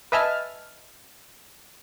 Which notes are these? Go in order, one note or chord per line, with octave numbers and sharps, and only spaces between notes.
B4 D#5 E5 G#5 A5 F6